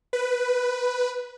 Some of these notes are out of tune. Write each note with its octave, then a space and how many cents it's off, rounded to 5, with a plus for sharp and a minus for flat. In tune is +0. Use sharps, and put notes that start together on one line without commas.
B4 +5